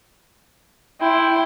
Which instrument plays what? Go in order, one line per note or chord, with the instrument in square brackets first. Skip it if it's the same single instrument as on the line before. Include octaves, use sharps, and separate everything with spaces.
[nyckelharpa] E4 C6 [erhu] G5